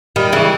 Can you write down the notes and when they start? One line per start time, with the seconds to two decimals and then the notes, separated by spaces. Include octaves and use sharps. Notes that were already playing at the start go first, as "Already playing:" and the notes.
0.16 D#3 G3
0.32 C#3 E3